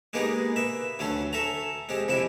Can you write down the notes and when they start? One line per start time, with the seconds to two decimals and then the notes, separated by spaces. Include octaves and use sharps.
0.13 G#3 A#3 B3 D#4 G4 G#4
0.56 B4 E5
0.99 D2 F#3 A3 C#4 C6
1.33 A4 E5 G#5 A#5
1.89 G#3 C4 G4
2.08 F2 C3 C4 E4 E5